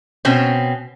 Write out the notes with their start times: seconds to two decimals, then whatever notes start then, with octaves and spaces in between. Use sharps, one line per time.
0.25 B2 C4 C#4